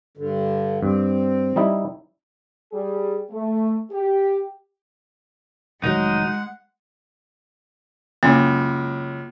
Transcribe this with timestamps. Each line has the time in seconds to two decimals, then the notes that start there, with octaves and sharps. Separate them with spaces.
0.17 G2 D3
0.83 G2 C4
1.56 G3 D#4 E4
2.72 G3 G#4
3.31 A3
3.91 G4
5.84 F1 D#3 F#3 G#3 D#4 F#5
8.23 C#2 F#2 A#3 E4